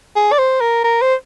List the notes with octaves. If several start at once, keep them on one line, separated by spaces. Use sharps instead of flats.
G#4
D5
C5
A#4
A#4
C5